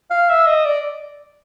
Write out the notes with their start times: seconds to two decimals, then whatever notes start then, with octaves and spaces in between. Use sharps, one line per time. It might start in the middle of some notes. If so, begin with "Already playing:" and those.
0.10 F5
0.29 E5
0.47 D#5
0.65 D5